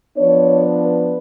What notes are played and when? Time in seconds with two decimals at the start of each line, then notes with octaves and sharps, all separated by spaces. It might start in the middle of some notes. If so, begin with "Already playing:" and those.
0.17 F3 B3 D4 C#5
0.83 B4